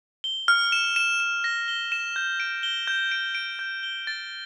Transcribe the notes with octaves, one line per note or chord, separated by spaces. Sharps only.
G7
F6
E7
E7
E7
A#6
G7
E7
G6
D7
G7
G6
D7
D7
G6
G7
A6